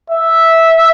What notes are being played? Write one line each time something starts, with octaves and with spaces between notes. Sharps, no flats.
E5